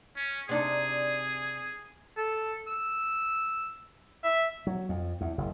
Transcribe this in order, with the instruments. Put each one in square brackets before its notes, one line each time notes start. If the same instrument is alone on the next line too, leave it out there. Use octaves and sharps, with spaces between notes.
[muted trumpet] C#4
[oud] C3 D4 D#4 [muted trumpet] G#4
[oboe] A4
E6
E5
[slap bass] F#3
F2
E2
F#1